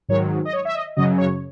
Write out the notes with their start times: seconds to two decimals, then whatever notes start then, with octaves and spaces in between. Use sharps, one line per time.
0.09 G#2 D#3 F#3 C#5
0.45 D#5
0.53 C#5
0.65 E5
0.75 D#5
0.96 F#2 C#3 F#3 D#5
1.18 C#5